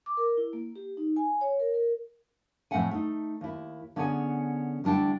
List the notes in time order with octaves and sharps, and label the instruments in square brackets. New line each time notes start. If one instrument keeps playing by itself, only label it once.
[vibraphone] D6
A#4
E4
A#3
G4
D#4
G#5
C#5
A#4
A#4
[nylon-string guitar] F2 A2 C4 E5 F#5 G#5
A3 D#4
D#2 E4
D3 B3 C#4 G#4 C#5 G#5
D2 G3 D4 E4 G5